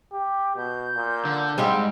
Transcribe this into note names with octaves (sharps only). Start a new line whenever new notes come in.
G4
B2 G6
A#2
D3
G#2 G3 G#3 C4 G4 F5